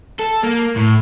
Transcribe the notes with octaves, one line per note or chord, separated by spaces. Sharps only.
A4
A#3
A2